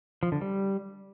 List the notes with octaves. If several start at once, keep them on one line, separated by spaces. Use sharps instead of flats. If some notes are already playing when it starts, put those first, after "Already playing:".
F3
D3
G3